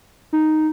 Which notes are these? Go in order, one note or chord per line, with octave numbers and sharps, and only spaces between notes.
D#4